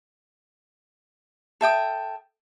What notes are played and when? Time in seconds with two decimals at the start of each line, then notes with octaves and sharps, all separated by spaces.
1.61 A4 E5 G5 D#6